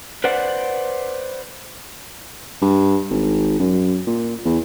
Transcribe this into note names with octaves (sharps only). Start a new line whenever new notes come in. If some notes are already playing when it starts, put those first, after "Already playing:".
B4 C5 D5 F#5
G2
G#1
F#2
A#2
E2